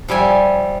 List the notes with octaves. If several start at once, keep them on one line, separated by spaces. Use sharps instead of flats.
F3 G3 E5 G#5